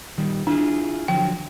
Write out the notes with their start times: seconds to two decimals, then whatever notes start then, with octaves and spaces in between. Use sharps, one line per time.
0.18 D#3 G3
0.47 D4 E4 F4 G#4
1.08 D3 F3 F#3 G5